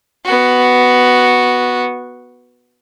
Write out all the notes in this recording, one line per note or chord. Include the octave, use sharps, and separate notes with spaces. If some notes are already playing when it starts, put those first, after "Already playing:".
B3 F#4